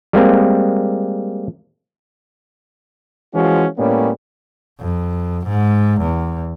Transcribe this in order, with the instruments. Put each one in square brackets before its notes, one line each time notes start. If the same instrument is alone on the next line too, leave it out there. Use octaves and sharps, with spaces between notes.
[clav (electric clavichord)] G3 G#3 A#3 C4
[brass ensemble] E3 F3 G#3 C#4 F#4
A2 G3 A#3 B3 C#4
[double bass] F2
G#2
E2